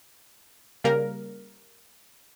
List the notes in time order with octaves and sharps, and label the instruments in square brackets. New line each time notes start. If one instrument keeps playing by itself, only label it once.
[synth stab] C#3 G3 A#3 A#4